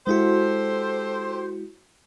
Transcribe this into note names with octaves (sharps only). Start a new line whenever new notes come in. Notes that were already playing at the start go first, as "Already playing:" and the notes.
G#3 E4 F#4 G4 A4 C5